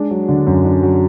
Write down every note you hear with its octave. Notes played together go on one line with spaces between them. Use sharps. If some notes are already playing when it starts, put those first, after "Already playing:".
Already playing: G#3 D4
F#3
D3
F#2
D4
F#3